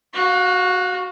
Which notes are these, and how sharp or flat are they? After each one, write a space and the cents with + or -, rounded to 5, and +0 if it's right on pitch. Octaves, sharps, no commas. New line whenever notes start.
F#4 +0 F5 +35